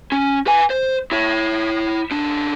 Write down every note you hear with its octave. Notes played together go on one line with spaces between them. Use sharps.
C#4
B4 G#5
C5
E4 C#5
C#3 D4